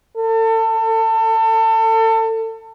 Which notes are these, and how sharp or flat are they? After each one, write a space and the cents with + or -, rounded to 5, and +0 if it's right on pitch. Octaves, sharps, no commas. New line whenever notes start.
A4 +30